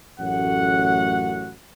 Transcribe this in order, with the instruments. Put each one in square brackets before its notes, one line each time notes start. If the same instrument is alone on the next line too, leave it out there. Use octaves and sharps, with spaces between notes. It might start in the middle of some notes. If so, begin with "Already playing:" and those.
[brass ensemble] A1 F#2 A3 F#4 F#5